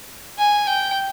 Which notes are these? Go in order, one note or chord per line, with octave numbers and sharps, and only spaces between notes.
G#5
G5